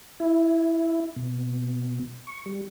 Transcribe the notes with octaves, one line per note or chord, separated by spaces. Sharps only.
E4
B2
C#6
G3